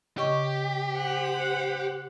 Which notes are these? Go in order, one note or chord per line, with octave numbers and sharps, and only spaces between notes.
C#3 G4 D#5 C#6
C5 F#5